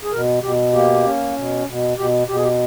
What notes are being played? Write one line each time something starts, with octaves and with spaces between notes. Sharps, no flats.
G#4
B2 A#4
B2 G4
A#3 G4
C#4
B2
B2
B2 G4
B2 G4
G#4
G4